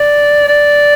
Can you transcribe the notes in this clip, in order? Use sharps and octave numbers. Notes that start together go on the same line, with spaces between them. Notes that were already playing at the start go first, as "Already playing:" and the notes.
Already playing: D5
D5